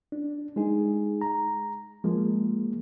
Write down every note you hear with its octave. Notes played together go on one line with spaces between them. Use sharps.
D4
G#3 D#4 G#4
A#5
F3 G#3 A#3